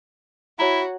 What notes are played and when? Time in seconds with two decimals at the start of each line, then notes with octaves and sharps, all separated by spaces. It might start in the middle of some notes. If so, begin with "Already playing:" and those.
0.59 E4 F#4 C#5 A#5